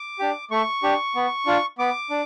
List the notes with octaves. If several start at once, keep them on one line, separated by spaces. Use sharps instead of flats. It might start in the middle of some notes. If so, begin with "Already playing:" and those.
Already playing: D6
D4 G4
A3 C#6
D4 G4
B3
D4 F4
B3 D6
D4